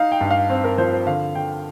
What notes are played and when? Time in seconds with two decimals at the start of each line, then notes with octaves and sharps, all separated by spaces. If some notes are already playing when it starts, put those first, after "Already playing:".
Already playing: D#4 F5
0.12 G5
0.21 G2
0.31 F5
0.50 C4
0.64 A#4
0.78 F3 C5
0.93 C5
1.07 D3 F5
1.35 D3 G5